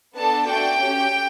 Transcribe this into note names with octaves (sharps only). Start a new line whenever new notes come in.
B3 D4 A4 A5
A3 D4 F#4 G5
C#4 G4